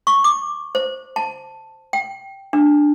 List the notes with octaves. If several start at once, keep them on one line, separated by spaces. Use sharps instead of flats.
C#6
D6
C5
A5
G5
D4